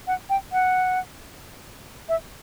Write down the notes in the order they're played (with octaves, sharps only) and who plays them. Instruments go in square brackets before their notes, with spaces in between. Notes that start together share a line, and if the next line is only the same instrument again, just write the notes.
[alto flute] F#5
G5
F#5
E5